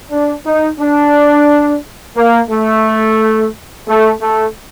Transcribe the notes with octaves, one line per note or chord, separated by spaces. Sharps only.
D4
D#4
D4
A#3
A3
A3
A3